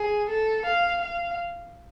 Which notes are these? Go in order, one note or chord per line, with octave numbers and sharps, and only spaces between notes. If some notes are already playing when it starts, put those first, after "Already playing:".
Already playing: G#4
A4
F5
F5